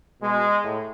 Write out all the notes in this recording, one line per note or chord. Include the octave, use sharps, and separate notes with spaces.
B2 G#3
A2